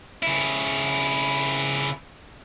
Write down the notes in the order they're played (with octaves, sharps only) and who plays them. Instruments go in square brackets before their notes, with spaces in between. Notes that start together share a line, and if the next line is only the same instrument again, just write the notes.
[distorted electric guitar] C#3 E4